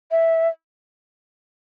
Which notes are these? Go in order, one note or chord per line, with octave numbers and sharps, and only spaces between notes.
E5